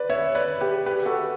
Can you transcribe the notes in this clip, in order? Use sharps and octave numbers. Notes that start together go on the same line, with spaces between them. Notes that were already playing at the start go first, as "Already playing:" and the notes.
Already playing: B4 D5
C#5 E5
B4 D5
G4 B4
G4 B4
F#4 A4